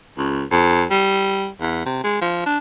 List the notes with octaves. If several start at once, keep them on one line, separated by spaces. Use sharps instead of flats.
C#2
F2
G3
E2
C3
G#3
F3
D4